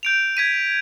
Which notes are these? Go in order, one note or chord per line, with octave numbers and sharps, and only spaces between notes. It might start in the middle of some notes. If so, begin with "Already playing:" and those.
G6 D7 F7
G#6 B6 D#7